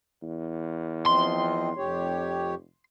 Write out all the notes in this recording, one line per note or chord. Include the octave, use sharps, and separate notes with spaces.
E2
F3 C4 D#5 C6
F1 F2 G4 C#5